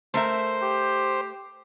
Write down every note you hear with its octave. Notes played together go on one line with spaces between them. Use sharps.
A3 A#4 C5 E5
G4